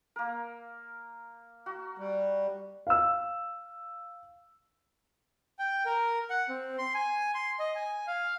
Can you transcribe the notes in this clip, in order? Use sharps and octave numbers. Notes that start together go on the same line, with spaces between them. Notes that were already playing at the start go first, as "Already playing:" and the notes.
A#3 A#4
F#4
G3
F5 E6
G5
A#4
F#5
C4
C6
G#5
C6
D#5
G#5
F5